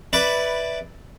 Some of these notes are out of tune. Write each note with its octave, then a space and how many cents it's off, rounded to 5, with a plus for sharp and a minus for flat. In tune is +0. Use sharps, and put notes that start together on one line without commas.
E4 -10 B4 +0 D5 +0